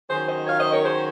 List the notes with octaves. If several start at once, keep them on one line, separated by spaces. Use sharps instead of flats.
D#3 F#3 C#4 G#4 C5
C5 D#5
C#5 F5
C5 D#5
A#4 C#5
G#4 C5